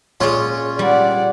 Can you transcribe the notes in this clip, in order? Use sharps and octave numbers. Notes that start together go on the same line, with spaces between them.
A#2 G#3 C#4 F4
G3 D5 F#5